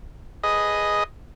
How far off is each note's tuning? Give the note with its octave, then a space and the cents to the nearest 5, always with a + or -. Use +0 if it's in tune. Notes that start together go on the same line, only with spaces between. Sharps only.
G#4 +0 B4 +0 D#5 +0